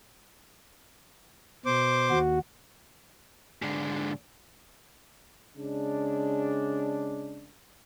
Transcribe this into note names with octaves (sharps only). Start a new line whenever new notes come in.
B2 C5 D6
D#2 F#4
G#2 D3
C#3 G#3 D4